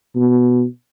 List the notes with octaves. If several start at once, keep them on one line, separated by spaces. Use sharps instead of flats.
B2